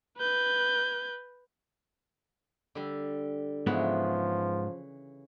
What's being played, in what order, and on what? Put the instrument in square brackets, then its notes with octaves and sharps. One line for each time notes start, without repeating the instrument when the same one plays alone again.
[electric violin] B4 G6
[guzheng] D3 G3
[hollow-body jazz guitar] G#2 G#3 B3 [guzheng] C#3 E3 [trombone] F3